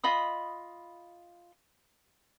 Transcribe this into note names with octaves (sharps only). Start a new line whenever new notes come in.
F4 D#5 B5 D#6